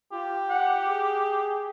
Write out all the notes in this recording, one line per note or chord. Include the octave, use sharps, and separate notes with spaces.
F4 G4
F#5
G#4